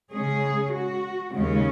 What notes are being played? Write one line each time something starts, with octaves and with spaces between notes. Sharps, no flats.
C#3 G#3 C#4 G#4
F#4
D#2 C#3 G#3 C#4